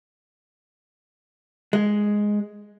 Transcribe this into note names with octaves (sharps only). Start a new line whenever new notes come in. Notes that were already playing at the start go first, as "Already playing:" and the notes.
G#3